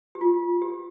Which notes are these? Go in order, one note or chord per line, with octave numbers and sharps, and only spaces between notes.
G4
F4
G4